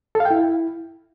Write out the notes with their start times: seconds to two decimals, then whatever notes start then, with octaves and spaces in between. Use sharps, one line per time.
0.15 A4
0.20 F5
0.25 G5
0.30 E4